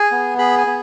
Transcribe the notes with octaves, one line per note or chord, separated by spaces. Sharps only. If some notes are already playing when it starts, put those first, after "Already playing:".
Already playing: G#4 G#5
B3
G#4 B5
G#5
B3